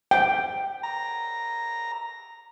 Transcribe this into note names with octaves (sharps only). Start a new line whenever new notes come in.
G5
A#5